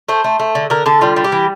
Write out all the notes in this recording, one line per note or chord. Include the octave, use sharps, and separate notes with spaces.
A3 C5
A3
A3
D3
D3 A#4
D3 A4
G3 F4
G3
G4
E3